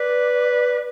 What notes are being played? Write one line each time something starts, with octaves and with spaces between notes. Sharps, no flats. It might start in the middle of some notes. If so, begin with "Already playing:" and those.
Already playing: B4 D5